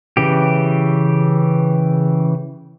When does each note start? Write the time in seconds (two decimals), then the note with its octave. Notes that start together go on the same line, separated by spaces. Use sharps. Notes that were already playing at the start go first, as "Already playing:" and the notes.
0.17 C#3 E3 G4